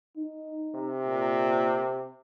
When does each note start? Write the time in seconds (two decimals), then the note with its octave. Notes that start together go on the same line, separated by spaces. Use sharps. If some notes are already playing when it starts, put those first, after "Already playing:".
0.17 D#4
0.75 C3
1.07 A#2